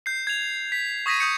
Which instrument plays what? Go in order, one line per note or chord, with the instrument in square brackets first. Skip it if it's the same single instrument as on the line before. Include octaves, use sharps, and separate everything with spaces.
[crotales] G6 C7
G#6 F7
B6
C#6 D#6 G#6 A#6 B6 D#7
D#6 G6 C#7